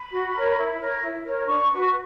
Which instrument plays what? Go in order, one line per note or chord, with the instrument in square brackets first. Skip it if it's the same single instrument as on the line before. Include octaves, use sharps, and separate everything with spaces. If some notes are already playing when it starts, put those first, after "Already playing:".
Already playing: [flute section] B5
F#4
A#4 C#5
E4
A#4 C#5
E4
A#4 C#5
D4 C#6
F#4 B4